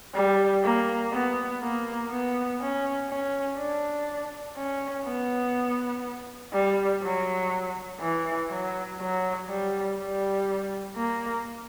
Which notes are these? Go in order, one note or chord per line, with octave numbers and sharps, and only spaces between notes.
G3
A#3
B3
A#3
B3
C#4
C#4
D4
C#4
B3
G3
F#3
E3
F#3
F#3
G3
G3
A#3